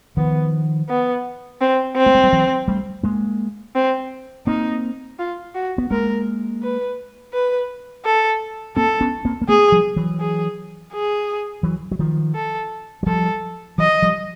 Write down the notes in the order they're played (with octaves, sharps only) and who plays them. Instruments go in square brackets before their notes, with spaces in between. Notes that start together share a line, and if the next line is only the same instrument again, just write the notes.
[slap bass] D#3 F3 [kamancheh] B3
[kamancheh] B3
C4
C4
[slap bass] A3
G#3
G3
E3 F#3
G3 A3
G#3 A#3
[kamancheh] C4
[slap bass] A#3 C4 [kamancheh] D#4
[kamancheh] F4
F#4
[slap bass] B3
[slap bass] G#3 A#3 [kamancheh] A#4
[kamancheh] B4
B4
A4
[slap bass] A#3 C4 [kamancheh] A4
[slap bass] B3 C#4
A#3 C4
A#3
[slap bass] A3 B3 [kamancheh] G#4
[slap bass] F3 G3
E3 F#3
[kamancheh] G#4
G#4
[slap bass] E3 F#3
F#3
D#3 F3
[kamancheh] A4
[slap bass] F#3
[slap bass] F3 G3 [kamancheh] A4
[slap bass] E3 F#3 [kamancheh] D#5
[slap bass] F3 G3